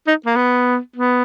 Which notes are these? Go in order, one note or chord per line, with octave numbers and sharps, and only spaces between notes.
D#4
A#3
B3
B3